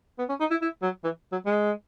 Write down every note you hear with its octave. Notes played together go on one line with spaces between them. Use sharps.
B3
C#4
D#4
E4
E4
F#3
E3
F#3
G#3